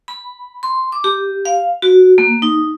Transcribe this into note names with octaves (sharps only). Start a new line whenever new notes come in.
B5
C6
D6
G4
F5
F#4
A#3
D#4